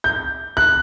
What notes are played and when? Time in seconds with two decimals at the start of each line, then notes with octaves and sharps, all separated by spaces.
0.04 G6
0.57 F#6